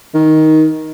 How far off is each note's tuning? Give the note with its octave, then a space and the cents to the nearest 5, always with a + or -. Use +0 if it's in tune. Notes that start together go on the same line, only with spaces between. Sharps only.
D#3 +10